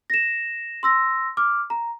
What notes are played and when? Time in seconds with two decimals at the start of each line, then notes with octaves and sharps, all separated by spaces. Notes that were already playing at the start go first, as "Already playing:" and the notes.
0.10 A#6 E7
0.83 C6 E6 A#6
1.37 D6 F6
1.70 A#5